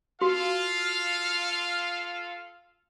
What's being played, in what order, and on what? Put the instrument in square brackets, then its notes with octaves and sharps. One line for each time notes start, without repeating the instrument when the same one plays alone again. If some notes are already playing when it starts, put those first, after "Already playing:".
[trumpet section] F4 A4 F5 [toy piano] F#4